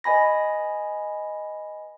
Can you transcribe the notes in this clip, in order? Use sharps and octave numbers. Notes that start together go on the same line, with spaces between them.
B4 D#5 G#5 B5 A#6